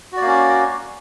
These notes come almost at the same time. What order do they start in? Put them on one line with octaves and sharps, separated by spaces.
F#4 D5 A#3 C#4